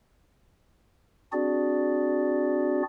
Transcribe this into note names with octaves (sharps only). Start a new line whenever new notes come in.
C4 D4 F#4 G#4 D5